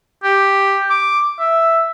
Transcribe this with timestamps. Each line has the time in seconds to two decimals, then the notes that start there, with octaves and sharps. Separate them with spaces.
0.24 G4
0.90 D6
1.40 E5